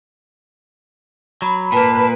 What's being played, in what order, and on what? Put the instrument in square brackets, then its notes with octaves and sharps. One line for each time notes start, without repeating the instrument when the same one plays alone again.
[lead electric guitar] F#3 [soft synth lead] B5
[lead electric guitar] A#2 A#3 [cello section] B4 [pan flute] A5